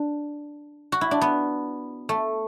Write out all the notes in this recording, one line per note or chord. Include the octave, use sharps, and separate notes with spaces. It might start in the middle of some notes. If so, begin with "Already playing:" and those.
Already playing: D4
F#4
E4
D4
B3
A3